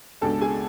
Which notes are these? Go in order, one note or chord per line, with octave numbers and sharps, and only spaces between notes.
C#2 B2 G#3 D4 A4 A5
G#4 G#5